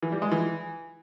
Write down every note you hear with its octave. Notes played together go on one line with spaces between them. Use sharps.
E3
G3
G#3
E3